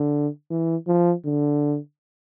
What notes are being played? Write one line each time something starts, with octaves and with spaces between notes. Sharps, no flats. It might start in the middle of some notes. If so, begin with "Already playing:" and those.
Already playing: D3
E3
F3
D3